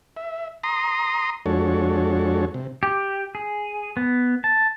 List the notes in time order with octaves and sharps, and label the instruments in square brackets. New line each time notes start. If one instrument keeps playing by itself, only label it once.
[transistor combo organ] E5
A#5 C6 D#6
F2 G#3 D4 F#4 A4 C#5
C3
[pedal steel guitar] G4
G#4
B3
A5